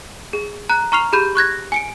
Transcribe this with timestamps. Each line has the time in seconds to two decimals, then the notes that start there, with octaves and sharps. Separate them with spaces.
0.33 G#4
0.69 A#5 F#6
0.92 A#5 C#6 F6 C7 F7
1.13 G4 G#4 B5 G6
1.35 C#6 F#6 G#6 A#6
1.72 G#5 C#7 D7